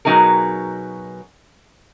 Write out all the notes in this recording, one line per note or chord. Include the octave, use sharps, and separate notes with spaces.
B2 F#3 D#4 G#4 A#4